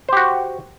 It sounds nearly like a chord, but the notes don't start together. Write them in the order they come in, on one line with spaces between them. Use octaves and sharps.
C5 G4 F#4